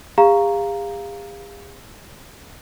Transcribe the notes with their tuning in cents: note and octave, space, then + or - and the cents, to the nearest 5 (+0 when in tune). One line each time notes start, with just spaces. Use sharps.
G#4 -45 F5 +0 A#5 +0